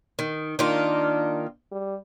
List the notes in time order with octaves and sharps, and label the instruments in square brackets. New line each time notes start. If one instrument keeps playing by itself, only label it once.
[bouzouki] D#3
[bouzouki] D#3 A#3 F4 [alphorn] D4
[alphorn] G3